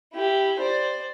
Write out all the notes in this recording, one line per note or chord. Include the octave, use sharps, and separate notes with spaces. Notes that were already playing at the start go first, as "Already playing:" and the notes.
E4 G4
C5 D5